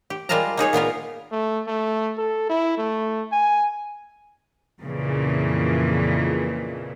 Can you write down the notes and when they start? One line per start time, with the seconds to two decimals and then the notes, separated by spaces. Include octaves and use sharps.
0.10 G4
0.29 G3 G#3 F4 A#4 A5 A#5
0.57 A#3 D#4 G#4 C#5
0.73 A#2 B3 F4 A#4
1.31 A3
1.67 A3
2.17 A4
2.49 E4
2.78 A3
3.32 G#5
4.81 F2 A#2 C#3 E3